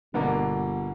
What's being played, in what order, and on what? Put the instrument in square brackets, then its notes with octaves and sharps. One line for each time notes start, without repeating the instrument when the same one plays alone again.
[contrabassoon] G1 [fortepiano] B2 D3 A#3